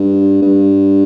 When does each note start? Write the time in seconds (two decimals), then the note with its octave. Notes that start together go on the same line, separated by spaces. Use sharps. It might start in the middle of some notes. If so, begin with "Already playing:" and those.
Already playing: G2
0.42 G2